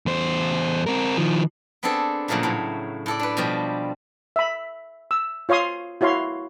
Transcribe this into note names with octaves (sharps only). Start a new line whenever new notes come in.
E2 C5
C4 A#4
D#3 F3
B3 C4 D4 G#4 A4
A#2 C#3 F3 F#3 A3
A2 F#3
A2 A4 D5
D4 B4
B2 F3 G3 F4
E5 B5
E6
F4 C#5 F5 C6 D#6
E4 F#4 C#5 F5 C6